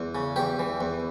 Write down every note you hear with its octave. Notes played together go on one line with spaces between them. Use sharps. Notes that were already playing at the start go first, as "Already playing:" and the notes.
Already playing: E2
C#3
E2 G4
E3
E2